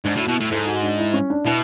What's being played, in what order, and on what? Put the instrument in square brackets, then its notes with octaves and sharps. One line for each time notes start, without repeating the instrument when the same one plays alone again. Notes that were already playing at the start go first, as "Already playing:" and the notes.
[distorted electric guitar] G#2 [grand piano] D4
[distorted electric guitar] A2 [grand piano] F#4
[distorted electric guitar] B2 [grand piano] E4
[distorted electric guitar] A2 [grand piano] E4
[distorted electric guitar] G#2 [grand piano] A4
[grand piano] F#4
D4
E4
C#4
D4
[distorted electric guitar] B2 [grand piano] E4